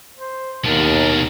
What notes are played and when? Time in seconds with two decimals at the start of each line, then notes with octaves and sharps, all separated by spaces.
0.17 C5
0.65 D#2 B2 D4 A#4